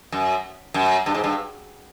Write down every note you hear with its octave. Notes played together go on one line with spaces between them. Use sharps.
F#2
F#2
G2
G#2
G2